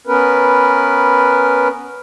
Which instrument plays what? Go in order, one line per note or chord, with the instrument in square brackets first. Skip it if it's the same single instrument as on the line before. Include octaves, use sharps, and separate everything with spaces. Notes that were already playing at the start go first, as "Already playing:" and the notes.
[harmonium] B3 C#4 A#4 B4